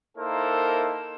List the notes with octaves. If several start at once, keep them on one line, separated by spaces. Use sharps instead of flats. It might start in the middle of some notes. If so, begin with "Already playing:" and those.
A#3 D#4 E4 A4 A#4 C5